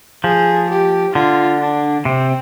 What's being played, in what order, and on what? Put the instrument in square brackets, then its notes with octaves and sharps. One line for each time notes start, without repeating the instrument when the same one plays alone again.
[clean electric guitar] F3 [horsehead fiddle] G#4
[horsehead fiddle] G4
[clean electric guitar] D3 [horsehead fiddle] F4
[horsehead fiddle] D4
[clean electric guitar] C3 [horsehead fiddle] C4